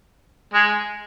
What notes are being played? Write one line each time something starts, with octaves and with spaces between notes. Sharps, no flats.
G#3 G#4